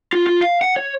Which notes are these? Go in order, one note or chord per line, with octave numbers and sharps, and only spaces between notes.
F4
F4
F5
F#5
C#5